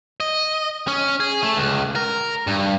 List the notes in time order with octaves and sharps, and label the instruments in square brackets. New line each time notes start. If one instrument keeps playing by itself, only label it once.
[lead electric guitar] D#5
C#4
G#4
A3
C#2
A#4
G2